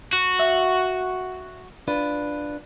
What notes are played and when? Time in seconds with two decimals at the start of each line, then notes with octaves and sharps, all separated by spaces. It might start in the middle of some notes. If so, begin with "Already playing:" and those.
0.13 F#4
0.39 E5
1.88 D4 F4 B4